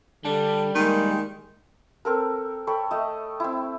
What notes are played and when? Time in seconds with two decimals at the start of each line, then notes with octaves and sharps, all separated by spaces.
0.25 D3 G3 D4
0.75 D#3 G#3 A#3
2.05 C4 A4 A#4
2.67 A4 C#5 G5 B5
2.91 A3 D#5
3.40 C4 E4